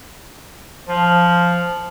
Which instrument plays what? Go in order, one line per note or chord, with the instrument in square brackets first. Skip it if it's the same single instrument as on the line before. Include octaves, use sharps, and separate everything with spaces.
[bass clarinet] F3